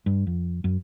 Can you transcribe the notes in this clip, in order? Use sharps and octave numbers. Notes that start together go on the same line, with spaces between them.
G2
F2
F#2